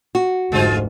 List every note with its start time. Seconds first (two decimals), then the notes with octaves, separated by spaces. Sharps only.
0.15 F#4
0.52 F1 D2 G#2 G#3 F4 C5